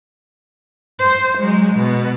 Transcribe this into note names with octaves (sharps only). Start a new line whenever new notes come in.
C5
F#3 G#3
B2